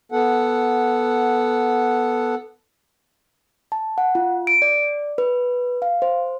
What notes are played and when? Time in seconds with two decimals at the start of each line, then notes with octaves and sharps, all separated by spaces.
0.12 B3 A4 F#5
3.72 A5
3.98 F#5
4.15 F4
4.47 D7
4.62 D5
5.18 B4
5.82 F5
6.02 C5